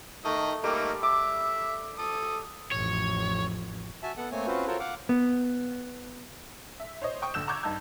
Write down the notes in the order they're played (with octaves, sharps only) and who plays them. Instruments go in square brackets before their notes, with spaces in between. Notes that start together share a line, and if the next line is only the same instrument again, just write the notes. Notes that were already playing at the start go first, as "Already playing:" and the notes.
[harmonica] D#3 D#5 [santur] A3
[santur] G3 [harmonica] A3 A#3 D#4
[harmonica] E5 [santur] D6
[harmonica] A4 D#6
[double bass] A1 F2 [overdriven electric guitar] C#5
[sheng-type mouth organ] F#4 E5 G#5 A5
B3 A4 F#5
A3 A#3 C4 C#5 G#5
C4 C#4 F4 F#4 B4 C5
F4 F#4 A4 A#4 C5 C#5
F5 F#5 D6
[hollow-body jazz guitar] B3
[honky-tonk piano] E5
C5 C#5 D#5
G5 C#6 D#6
A#1 D3 E6 G6 E7
A#5 C#6 D6 G6 G#6
G2 D#4 A5 E6 G6